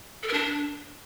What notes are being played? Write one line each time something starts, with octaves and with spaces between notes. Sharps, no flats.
A4
A#4
D4